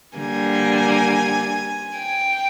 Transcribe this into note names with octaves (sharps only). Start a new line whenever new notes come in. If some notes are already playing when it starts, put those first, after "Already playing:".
D3 G3 A#3 G#5
G5